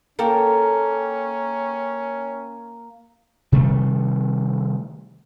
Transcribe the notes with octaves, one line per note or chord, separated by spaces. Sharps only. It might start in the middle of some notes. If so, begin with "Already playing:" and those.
A#3 C#4 A4 A#4 G5
C3 D#3 G3 A3